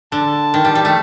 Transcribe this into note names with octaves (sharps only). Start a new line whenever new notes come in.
D3 A5
D#3
G3
G3
A3